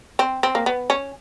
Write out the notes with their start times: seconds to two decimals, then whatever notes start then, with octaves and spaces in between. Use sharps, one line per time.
0.19 C4
0.43 C4
0.55 A#3
0.66 B3
0.90 C#4